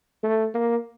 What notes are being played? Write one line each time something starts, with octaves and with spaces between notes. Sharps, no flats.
A3
A#3